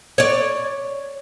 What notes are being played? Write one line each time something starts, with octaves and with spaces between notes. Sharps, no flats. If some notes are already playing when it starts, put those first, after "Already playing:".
C#5 D5